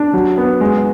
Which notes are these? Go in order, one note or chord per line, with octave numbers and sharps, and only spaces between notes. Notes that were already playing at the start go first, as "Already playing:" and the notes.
Already playing: D4
F#3
B3
G#3